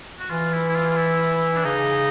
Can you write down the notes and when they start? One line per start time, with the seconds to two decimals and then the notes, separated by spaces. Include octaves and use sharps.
0.19 F#4
0.30 E3 F4
0.53 E4
0.70 E4
0.76 F4
0.90 F4
0.97 E4
1.56 D4
1.65 C#3 D#4